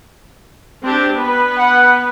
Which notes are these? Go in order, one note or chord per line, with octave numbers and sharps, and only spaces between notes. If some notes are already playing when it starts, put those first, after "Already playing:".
C4 D4 G4
B3 B4
F#5